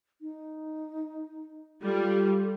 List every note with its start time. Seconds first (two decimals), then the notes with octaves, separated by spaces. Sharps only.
0.21 D#4
1.83 G3 F4 G4 A4